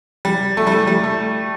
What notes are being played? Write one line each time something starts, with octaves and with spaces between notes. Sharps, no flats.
G3
A3
G3
A3
G3
A3